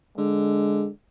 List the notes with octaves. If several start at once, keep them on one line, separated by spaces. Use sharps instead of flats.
D3 G#3